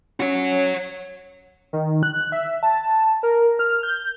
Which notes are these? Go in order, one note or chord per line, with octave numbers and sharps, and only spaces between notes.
C#4 F#4 C#5
D#3
F#6
E5
A5
A#4
F6
G6